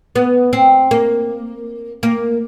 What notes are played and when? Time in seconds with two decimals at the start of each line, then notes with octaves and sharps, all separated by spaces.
0.15 B3
0.53 C4
0.91 A#3
2.03 A#3